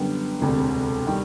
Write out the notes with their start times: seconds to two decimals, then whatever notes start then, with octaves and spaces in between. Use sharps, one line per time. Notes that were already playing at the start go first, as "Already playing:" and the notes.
Already playing: F#2 D3 G3 B3
0.41 E1 D2 C3
1.07 D#3 G3